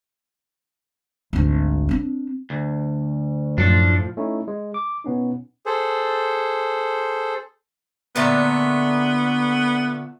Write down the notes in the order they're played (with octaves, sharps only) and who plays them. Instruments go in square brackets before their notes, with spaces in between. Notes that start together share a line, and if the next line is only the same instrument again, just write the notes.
[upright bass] G#1 D2
C4 D4
[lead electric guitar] D2
[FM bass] F#2 [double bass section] A2 F3 [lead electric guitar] D4 A4
[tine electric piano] A3 C#4 D#4 E4
G#3
D6
B2 B3 C#4 D#4
[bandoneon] G#4 A4 C5
[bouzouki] A#2 D3 A3 [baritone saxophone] B3